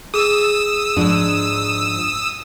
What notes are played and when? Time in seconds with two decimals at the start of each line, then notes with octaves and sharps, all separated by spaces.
0.14 G#4 D#6 E6
0.96 G#2 F3 D4